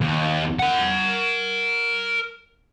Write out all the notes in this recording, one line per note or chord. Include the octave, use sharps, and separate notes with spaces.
D#2
A#4 F#5